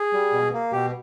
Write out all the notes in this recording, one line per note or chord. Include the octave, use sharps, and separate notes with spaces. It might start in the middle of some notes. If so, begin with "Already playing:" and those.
Already playing: G#4
G3
B2
A#3
B2 G4